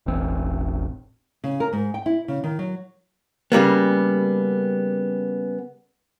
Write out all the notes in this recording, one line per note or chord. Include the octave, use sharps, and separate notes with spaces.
E1 A1 C4
C#3
A#4
G#2
G5
E4
C#3
D#3
F#3
C#3 G3 A#3 B3